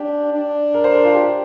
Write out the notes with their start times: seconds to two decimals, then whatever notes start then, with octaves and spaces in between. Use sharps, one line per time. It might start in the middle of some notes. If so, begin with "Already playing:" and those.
Already playing: D4 G4
0.33 D4
0.74 A#4
0.84 C5
0.94 A#4
1.04 F4
1.15 G4